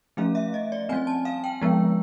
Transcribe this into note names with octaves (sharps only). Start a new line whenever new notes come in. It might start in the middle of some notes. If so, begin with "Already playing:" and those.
F3 A3 C#4 F5
E5
D#5
D5
G3 C4 G#5
A5
F5
G5
F3 G#3 B3